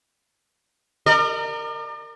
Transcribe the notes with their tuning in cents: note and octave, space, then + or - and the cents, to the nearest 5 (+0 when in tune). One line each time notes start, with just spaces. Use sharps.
A#4 -20 D5 +40